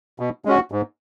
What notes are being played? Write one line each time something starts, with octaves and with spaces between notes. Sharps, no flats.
B2
G#3 C#4 F#4
G#2